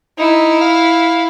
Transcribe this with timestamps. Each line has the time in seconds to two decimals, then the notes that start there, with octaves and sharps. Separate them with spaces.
0.19 D#4 E4
0.61 F5